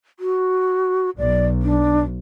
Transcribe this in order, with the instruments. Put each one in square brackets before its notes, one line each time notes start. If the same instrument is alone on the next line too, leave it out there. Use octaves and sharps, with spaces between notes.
[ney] F#4
[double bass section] B1 [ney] D5
[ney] D4